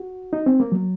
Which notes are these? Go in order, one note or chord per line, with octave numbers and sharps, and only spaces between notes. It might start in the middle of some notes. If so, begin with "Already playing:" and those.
Already playing: F#4
D#4
C4
A#3
F#3